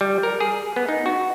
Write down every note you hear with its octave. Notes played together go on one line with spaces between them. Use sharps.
G3
A#4
G#4
B3
D#4
F#4